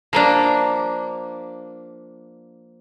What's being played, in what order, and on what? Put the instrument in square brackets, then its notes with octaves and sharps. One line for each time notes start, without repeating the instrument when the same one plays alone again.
[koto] F3 A#3 D4